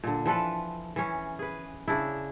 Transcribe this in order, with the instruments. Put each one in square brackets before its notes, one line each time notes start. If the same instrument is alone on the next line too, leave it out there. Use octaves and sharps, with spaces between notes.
[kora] A#2 D3
E3 F3 A4 B4
E3 C#4
G#4 B4
C#3 D4 E4